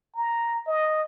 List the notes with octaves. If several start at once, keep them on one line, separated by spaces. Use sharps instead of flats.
A#5
D#5